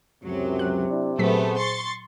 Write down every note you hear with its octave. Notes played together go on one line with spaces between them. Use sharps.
C#2 F#2 C3 F#3
F#6
D4 E4
A#2 F#3 A3 B3 G#4 C5 B6
C6 C#6 A6